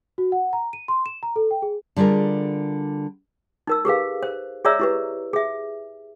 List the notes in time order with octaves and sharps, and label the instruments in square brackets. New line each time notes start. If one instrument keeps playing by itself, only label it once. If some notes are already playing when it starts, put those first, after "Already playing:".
[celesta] F#4
F#5
A#5
D#7
C6
E7
A#5
A4
G5
G#4
[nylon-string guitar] D3 G3 F4 G#4 A#4
[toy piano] D#4 A#4 E6
G4 G#4 B4 F5
C5
G#4 C#5 D5 E5 A#5 E6
E4 G4 B4
G#4 E5